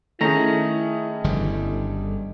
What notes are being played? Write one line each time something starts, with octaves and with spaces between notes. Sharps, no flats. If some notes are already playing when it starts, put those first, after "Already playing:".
D#3 A3 C#4 E4 G#4 A#5
G1 D3 G3